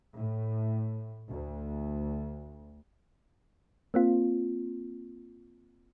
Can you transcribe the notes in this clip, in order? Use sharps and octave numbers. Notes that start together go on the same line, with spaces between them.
A2
D2
A#3 C4 F4